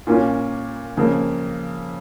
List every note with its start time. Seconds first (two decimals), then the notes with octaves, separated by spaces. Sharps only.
0.07 A#2 A#3 C#4 F4
0.97 F2 C#3 A#3